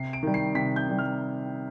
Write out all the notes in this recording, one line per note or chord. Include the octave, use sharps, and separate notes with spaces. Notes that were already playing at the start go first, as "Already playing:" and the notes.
Already playing: C3 C7
D7
D#3 G3
C7
C3 B6
G6
D#3 G3
F6